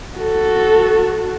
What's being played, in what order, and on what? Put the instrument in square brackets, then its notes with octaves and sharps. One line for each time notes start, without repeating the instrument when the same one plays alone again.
[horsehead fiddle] F#4 A4